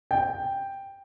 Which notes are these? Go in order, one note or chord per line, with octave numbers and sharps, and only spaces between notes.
G5